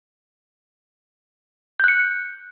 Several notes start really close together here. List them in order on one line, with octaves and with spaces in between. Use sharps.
G6 F#6 C#7